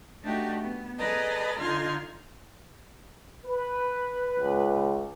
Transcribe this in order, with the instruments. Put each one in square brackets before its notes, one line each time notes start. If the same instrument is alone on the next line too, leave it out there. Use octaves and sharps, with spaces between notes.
[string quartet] A3 D4 D#4 F#4 G4
B3
G#4 A4 B4 D5 D#5 A#5
D3 D#4 F4 C6 F6 G#6
[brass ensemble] B4
[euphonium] C#2